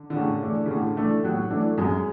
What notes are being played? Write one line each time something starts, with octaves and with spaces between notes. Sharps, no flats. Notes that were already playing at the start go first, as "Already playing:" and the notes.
Already playing: D3
D3
A2 C#3
E3 A3 D4 A4
C#3
A2 D3
E3 A3 D4 A4
A2 F#3
E3 A3 D4 A4
F#2 G#3